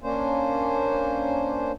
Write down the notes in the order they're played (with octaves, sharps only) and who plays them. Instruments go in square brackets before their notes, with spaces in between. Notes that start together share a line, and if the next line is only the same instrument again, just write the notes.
[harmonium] A#3 C#4 D4 C5